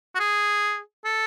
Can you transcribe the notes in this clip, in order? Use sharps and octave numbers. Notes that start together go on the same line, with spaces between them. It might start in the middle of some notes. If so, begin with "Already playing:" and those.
F#4
G#4
A4